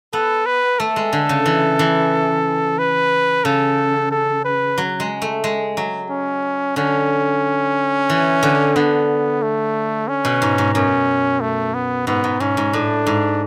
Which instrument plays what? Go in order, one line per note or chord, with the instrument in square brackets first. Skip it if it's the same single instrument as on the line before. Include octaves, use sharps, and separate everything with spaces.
[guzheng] B3 [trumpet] A4
[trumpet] B4
[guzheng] A3 [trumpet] A4
[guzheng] G#3
D3
C#3
E3
E3
[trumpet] B4
[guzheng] C#3 [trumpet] A4
[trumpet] A4
B4
[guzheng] F#3
G#3
A3
G#3
F#3
[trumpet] C#4
[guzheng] D3 [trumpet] C#4
[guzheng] E3
D3
[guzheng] D3 [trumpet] B3
[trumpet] A3
C#4
[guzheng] B2
G#2
G#2
[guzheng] F#2 [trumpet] C#4
[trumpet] A3
B3
[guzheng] G#2 [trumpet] B3
[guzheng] G#2
[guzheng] G#2 [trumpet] C#4
[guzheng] G#2
[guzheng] A2 [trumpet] D4
[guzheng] G#2